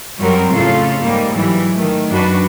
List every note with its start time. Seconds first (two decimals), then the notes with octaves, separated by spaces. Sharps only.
0.18 F#2 F#3 G3 C4 F#4 A#4
0.51 F2 A2 C#3 F4 A4 F5
1.03 G#2 G3 A#3
1.34 G#2 E3 F#3 G3
1.74 D#3 A3
2.09 F#2 D4 F#4 B4